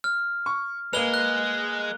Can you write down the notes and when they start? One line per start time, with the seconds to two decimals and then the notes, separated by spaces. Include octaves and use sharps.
0.04 F6
0.46 C#6
0.93 G#3 A#3 B4 F7 G7
1.14 F#6